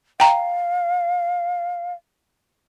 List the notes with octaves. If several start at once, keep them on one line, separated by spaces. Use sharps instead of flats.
F5 G5 A#5